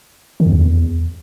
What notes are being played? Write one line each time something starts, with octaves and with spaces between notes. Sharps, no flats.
D#3
F2
E2